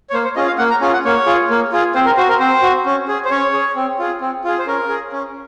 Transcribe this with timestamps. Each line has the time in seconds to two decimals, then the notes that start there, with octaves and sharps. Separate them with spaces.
0.10 C#5
0.14 A#3 C5
0.24 C5
0.36 C#4 F4 G#4 D#5
0.47 F5
0.58 A#3 F#5
0.70 A#5
0.81 C#4 F4 G#4 G#5
0.93 F#5
1.05 A#3 C#5
1.26 F4 G#4
1.50 A#3
1.72 F4 G#4
1.95 C4 C5
2.05 A#4
2.17 F#4 C5
2.29 A#4
2.40 C4 C5
2.62 F#4
2.86 C#4
3.08 G#4
3.25 C5
3.31 C#4 C#5
3.54 G#4
3.76 C4
3.99 F4 G#4
4.21 C4
4.44 F4 G#4
4.59 C5
4.66 C#4 A#4
4.89 G#4
5.12 C#4